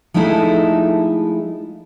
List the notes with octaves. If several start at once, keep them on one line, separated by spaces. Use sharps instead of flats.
F3 G#3 A3 D#4 E4 A4